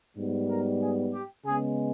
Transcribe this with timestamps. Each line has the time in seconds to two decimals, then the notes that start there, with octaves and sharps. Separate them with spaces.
0.16 G#2 G3 B3
0.48 A#4
0.81 G#4
1.13 G4
1.45 C#3 G#3 B3 G#4